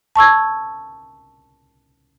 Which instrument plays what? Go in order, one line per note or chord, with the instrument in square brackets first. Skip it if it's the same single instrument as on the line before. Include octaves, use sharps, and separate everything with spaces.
[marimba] A5 C#6 E6 G#6